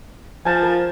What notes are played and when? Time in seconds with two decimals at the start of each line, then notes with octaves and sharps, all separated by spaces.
0.45 F3 G#5 A5
0.63 A#4